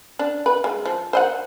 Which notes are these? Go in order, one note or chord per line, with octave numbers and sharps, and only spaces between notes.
D4
B4
G#3
F3
C5 D#5 F#5